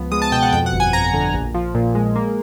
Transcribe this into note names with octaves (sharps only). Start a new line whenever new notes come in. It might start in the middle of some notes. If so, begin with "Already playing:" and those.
Already playing: C#2 F3 B3
G#3 D#6
A5
B2 G5
F#5
F2 G5
F#5
G1
G#5
F2 A#5
D3
A#1
F3
A#2
G#3
A#3